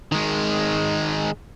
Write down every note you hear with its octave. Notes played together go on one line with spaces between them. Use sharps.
D#3 G#3